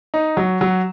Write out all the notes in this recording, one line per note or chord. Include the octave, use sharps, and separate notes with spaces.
D#4
F#3
F#3